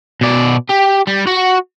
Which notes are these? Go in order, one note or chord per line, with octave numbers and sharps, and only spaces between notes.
B2 D5
G4
G3
F#4 F#5